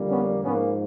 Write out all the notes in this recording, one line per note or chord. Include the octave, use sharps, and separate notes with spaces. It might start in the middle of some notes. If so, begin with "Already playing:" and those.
Already playing: F2 D3 G3 A#3
B3 C#4
G#2 F3 A#3 B3 C#4